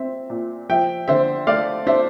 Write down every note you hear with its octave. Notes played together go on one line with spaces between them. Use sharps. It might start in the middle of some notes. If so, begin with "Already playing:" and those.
Already playing: C4 E5
A#2
F3 E5 G5
D3 C5 E5
A3 D5 F5
D4 C5 E5